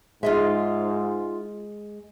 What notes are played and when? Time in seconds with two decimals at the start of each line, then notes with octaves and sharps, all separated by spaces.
0.23 G#2 G#3 F4 D#5 E5